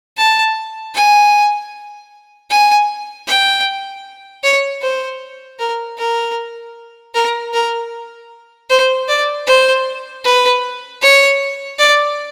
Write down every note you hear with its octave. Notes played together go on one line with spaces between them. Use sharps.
A5
G#5
G#5
G5
C#5
C5
A#4
A#4
A#4
A#4
C5
D5
C5
B4
C#5
D5